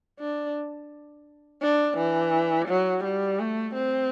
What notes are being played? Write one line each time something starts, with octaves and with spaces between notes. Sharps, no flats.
D4
D4
E3
F#3
G3
A3
C4